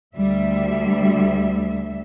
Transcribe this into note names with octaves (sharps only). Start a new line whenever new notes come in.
D2 G3 E5